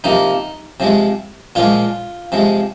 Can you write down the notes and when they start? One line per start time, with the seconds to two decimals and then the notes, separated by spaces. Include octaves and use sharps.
0.04 C3 F3 A#3 D#4
0.80 C3 F3 G#3
1.55 A#2 F3 G#3 F4
2.32 C3 F3 G#3